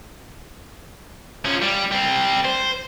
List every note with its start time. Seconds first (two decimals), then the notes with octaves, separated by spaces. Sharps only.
1.45 F3 C#4
1.62 G3
1.92 G3 C4
2.45 C5